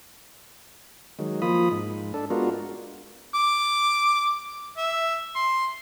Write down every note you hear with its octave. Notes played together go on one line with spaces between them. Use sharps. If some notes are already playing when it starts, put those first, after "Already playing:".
D#3 F#3 G#3
F3 A#3 F4 B5 D#6
G#2
D4 A4
G#3 B3 D4 F4 F#4 A#4
D6
E5
C6